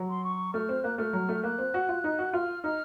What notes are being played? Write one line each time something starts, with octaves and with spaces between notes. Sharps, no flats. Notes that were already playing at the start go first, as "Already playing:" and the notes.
Already playing: F#3
C6
C#6
A3 F6
C4
A#3 F#6
A3 F6
F#3
A3
A#3 F#6
C4
F#4
F4
D#4
F#4
F4 F6
D#4 F6